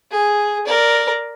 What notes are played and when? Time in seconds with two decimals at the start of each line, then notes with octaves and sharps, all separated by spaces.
0.11 G#4
0.66 A#4 D5